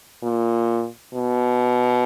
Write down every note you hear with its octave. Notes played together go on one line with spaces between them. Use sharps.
A#2
B2